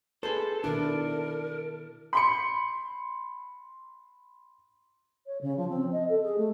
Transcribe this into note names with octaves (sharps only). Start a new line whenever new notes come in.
G#4 A4 B4 C5
B2 D#3 D4 E4 A#4
B5 C6 C#7
C#5
C#3
F3
C4
D#5
A4
G#4
A3